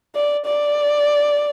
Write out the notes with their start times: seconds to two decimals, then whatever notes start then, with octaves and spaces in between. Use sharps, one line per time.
0.15 D5
0.46 D5